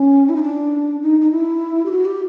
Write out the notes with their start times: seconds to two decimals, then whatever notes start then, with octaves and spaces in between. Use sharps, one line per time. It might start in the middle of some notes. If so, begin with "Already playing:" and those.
Already playing: C#4
0.29 E4
0.36 D#4
0.43 D4
1.02 D#4
1.21 D#4
1.32 E4
1.86 G4
1.92 F#4
2.05 G4